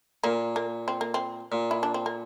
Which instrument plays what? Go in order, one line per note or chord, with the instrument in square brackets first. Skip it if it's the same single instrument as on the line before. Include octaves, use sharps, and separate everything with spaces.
[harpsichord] A#2 [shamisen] A#3
[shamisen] A#3
C4
A#3
C4
[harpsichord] A#2
[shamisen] E4
D4
C4
A#3